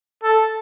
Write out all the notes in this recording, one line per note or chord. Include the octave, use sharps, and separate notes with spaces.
A4